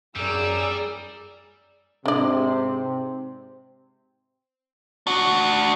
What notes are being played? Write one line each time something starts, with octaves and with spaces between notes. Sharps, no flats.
F#2 G3 G#4 D5 A#5 E6
G#2 C3 C4 D4 D5
D4 F#4